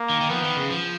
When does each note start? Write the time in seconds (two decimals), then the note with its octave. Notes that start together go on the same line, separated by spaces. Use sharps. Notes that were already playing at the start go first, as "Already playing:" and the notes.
Already playing: A#3
0.09 D#3
0.21 D#3
0.30 F3 B3
0.43 D#3
0.56 C#3
0.70 F3